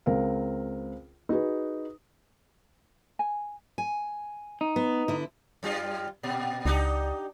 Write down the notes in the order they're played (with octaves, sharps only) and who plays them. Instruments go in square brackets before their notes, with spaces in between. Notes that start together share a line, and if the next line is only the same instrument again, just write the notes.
[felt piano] C#2 C4 A#4 F5
D#4 F#4 G#4 B4
[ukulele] G#5
[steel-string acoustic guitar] G#5
[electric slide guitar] D#4
[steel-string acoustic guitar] B3
D3 E4
[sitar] F#2 G3 F4
A#2
[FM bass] C#2 [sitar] D4 D#4 G4